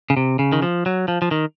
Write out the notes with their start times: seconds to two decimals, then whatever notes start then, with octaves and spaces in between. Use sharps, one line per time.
0.10 C#3
0.17 C3
0.39 C#3
0.52 D#3
0.62 F3
0.86 F#3
1.08 F3
1.22 F3
1.31 D#3